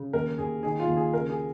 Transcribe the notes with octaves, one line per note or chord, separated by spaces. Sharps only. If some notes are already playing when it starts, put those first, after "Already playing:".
Already playing: C#3
D#2 A#4
D#2 G#4
D#3 G#4
F4
D#2
G#4
C#3 A#4
G#4